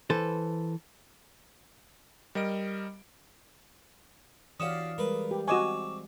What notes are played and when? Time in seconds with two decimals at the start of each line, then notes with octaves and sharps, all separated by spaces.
0.10 E3 A4 B4 C5
2.35 G3 A#4 D#5 D7
4.60 E3 C#4 F#4 G4 D5 F5 D#6 E7
4.98 G3 G#3 A#4 B4
5.31 G4
5.48 C4 F#4 D#5 G#5 C#6 D6 E7